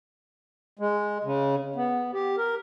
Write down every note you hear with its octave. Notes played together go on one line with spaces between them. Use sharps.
G#3
C#3
B3
G4
A#4